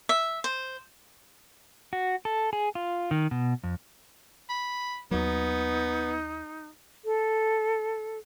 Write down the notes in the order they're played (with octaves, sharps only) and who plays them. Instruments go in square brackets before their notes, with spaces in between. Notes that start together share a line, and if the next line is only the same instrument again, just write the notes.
[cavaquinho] E5
C5
[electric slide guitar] F#4
A4
G#4
F4
D#3
B2
F2
[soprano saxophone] B5
[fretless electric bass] D#2 F#3 [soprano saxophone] B3 [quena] D#4
[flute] A4